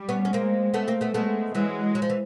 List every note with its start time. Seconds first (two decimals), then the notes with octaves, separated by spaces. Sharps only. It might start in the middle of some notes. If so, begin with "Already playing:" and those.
Already playing: G3
0.09 B3 C#4
0.25 C#4
0.33 G#3 A#3 C4
0.74 A3 B3
0.88 A#3 C4
1.01 A3 B3
1.14 G#3 A3 B3
1.55 E3 F#3 G#3
1.95 F#3
2.02 F3
2.10 E3